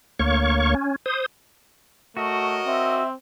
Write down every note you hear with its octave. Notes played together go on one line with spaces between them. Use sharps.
D2 A#3 C#5 C#6
C#4
C5 D#6
A3 F#4 A#4 C#5 D#5
C4 E5